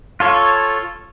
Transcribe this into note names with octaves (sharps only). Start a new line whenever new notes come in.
F4 A4 C#5